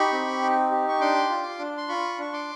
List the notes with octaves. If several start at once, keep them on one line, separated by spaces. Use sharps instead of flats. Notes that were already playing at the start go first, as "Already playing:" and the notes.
Already playing: D#4 G4 B5 C#6
C4
D#4
G4
C#6
D4 C6 D6
F4
D4
C6
F4 B5 C#6
D4 C#6
C6 D6